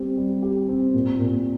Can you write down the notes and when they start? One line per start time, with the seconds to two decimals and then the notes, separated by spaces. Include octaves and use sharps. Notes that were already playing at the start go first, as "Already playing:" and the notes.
Already playing: G3 C4 G4
0.17 G3
0.42 G4
0.69 C4
0.94 A#2
1.19 A#2